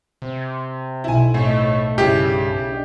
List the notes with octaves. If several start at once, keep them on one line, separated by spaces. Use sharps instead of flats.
C3
B1 E4 C5 G#5
A2 A3 D#5
G2 C#3 E4 G4 G#4
D4 D#5 G5